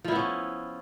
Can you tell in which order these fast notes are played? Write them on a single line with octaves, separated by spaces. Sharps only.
F3 E4 B3 C#4